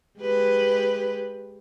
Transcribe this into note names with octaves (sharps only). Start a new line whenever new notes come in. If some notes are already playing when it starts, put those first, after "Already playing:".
G#3 G4 B4